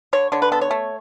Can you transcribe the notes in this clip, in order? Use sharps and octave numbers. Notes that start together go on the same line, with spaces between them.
D3 C#5
D3 C#5
B4
B3 A4
C#5
A3